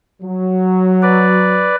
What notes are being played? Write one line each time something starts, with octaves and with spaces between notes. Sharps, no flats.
F#3
B4 D5